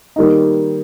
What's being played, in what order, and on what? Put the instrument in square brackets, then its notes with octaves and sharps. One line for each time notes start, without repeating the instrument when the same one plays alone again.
[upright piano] D#3 G3 A#3 D#4